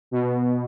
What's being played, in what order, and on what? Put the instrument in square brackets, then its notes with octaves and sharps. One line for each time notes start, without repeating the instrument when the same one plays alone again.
[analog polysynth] B2